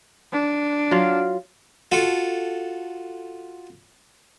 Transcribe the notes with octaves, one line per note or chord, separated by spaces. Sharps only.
D4
F#3 F4 F5
F4 F#4 A4